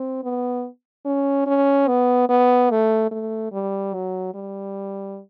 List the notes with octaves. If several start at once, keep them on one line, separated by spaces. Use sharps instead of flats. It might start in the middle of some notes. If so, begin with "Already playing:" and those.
Already playing: C4
B3
C#4
C#4
B3
B3
A3
A3
G3
F#3
G3